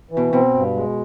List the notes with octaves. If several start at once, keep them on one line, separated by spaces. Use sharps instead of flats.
E3
B2
B2 C4
G2
G#3